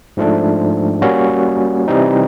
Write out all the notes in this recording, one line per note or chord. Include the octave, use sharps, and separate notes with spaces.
G#2 F3 A3 D4
G3 A#3 C#4 F#4
C3 E3 G3 C4 D#4